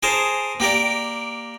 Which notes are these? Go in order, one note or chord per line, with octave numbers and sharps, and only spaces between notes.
G#4 A#4 C5 G#5 A5
A#3 G4 A#4 D5